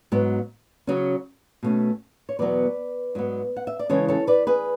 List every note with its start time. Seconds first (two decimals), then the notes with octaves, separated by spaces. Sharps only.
0.12 G#2 F#3 B3
0.87 C#3 F#3 C#4
1.63 B2 A3 C#4
2.29 C#5
2.39 E2 B2 F#3 B3 B4 D5
3.15 G#2 F#3 B3
3.56 F#5
3.67 E5
3.79 D5
3.89 C#3 E3 G#3 C#4 A4 C#5
4.08 A4 C#5
4.27 B4 D5
4.47 G#4 B4